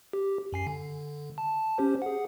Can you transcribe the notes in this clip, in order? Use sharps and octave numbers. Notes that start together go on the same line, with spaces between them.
G4
F#2 G#5 C7
D3
A5
C#4 G4 C5
G#4 F#5